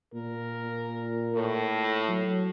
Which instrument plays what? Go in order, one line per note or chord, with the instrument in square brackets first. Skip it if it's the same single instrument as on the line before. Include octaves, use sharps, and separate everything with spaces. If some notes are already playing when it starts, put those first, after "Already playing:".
[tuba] A#2 [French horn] A#4
[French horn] A2
[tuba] F#3